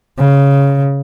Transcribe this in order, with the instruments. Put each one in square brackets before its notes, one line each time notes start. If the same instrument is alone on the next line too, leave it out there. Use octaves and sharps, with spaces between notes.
[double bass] C#3